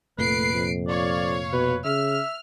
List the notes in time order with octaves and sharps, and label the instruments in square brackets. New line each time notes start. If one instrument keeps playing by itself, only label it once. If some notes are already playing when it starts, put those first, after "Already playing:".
[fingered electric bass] F1 A#2 [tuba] A3 [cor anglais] B4 [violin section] C7 D7
[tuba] F2
[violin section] C#5 F5 [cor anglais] D5
[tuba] B2 [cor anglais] B4
[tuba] C#3 [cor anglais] E5 [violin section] F6